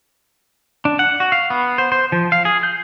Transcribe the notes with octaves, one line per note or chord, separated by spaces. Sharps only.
D4
F#5
F#4
F5
B3
C5
C5
F3
F5
G#4
G6